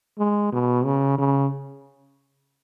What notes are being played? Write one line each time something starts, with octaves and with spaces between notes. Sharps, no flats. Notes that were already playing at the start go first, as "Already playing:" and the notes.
G#3
B2
C#3
C#3